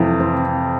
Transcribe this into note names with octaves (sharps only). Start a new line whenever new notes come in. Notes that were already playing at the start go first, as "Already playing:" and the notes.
Already playing: F2 C3 E3
C4